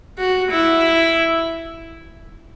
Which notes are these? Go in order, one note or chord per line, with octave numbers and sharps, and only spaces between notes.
F#4
E4